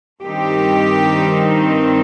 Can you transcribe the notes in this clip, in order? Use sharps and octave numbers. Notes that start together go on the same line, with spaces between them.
G2 D#3 C4 D#4 G4